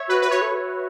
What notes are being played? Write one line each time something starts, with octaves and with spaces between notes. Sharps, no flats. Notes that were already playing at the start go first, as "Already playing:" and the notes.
Already playing: C#5 E5
F#4 B4
B4
F#4 C#5
A4
F#4